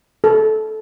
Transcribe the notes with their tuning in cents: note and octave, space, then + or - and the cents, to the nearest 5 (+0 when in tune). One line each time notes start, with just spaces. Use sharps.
A4 -15